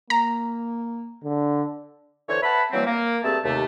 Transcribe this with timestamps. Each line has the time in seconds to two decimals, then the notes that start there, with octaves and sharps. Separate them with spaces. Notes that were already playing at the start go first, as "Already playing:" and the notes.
0.10 A#3 A#5
1.24 D3 D4
2.29 D3 E3 C5 C#5
2.43 B4 E5 F#5 A5 B5
2.72 E3 F#3 G3 A#3 C4
2.86 A#3
3.24 G2 A3 C4 G#4 A5
3.44 D#2 C3 A3